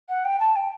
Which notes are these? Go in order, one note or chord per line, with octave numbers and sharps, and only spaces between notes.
F#5
G5
A5
G5